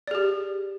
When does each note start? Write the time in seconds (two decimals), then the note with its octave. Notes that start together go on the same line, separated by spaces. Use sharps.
0.07 D5
0.11 G#4
0.15 G4